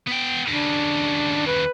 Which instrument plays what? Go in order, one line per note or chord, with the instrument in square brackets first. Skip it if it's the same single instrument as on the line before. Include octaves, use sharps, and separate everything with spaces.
[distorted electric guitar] B3 G5
[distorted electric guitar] D#2 C#3 [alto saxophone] D4
[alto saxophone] B4